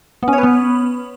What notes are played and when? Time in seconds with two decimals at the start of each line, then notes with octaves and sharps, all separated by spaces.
0.23 B3
0.28 C#4
0.33 C#5
0.38 B4
0.43 B3